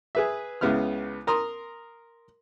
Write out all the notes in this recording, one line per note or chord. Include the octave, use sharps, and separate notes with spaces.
G#4 B4 E5
C#2 C#3 B3 E4 F6
A#4 A#5 C6 D#6